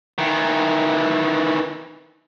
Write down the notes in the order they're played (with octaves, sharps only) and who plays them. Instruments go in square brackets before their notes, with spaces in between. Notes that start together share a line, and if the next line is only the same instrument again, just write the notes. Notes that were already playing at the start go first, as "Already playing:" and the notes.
[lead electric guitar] D#3 E3